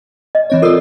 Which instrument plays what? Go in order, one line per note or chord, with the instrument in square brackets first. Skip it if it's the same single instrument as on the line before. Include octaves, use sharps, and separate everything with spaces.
[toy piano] D#5
[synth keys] E3 C4 C#5
[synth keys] F4 D5 [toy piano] A4 A#4